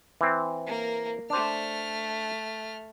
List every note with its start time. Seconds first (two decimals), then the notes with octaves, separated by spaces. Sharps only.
0.21 E3 C4
0.67 A#3 A#4
1.30 A3 D4 C5 F6